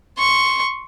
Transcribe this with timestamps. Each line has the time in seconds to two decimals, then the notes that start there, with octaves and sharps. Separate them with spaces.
0.18 C6 C#6